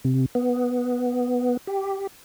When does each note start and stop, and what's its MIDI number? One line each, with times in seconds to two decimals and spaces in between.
0.05 0.26 48
0.35 1.57 59
1.67 2.07 67